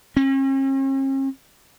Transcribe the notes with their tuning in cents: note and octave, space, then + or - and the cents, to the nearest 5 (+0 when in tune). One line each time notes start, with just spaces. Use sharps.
C#4 -45